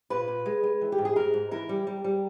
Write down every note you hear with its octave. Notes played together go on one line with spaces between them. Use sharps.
A#2 B4
A#2
G#3
G#3
E3
G4
G#2
G#4
G#2 A#4
G#2
E3 A#4
G3
G3
G3